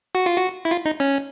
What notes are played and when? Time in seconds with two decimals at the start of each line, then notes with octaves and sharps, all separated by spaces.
0.15 F#4
0.26 F4
0.37 F#4
0.65 E4
0.71 F4
0.85 D#4
1.00 C#4